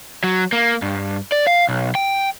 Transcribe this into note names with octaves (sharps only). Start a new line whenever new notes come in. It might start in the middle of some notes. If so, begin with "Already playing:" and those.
F#3
A#3
G2
D5
F5
B1
G5